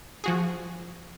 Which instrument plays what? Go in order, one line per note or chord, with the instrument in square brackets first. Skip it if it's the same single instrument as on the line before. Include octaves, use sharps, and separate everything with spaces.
[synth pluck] F3 F#4 G#4